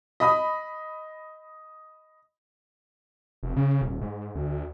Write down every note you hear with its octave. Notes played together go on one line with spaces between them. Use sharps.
D#5 B5 D#6
F1
C#3
D#1
G#2
D2